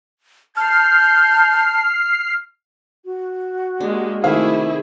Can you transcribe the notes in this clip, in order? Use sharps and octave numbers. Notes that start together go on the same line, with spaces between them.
A5 F6 G6 C7
F#4
G#3 A#3 D4 G4
C3 D#3 A3 E4 G#4 A4 F5